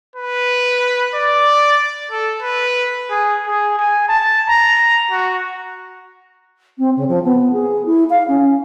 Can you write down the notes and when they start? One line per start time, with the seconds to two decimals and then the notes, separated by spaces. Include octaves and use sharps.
0.16 B4
1.14 D5
2.11 A4
2.42 B4
3.11 G#4
3.47 G#4
3.79 G#5
4.08 A5
4.48 A#5
5.11 F#4
6.78 C4
6.96 C#3
7.08 F3
7.24 B3
7.52 G#4
7.85 E4
8.10 F5
8.28 C#4